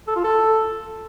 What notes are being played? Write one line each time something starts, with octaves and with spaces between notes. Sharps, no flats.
A4
F4
A4